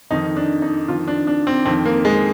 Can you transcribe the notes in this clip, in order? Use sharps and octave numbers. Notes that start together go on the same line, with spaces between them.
F2 D#3 D#4
D4
D#4
F2 D#3 F4
D4
D4
C4
F2 D#3 C4
A#3
G#3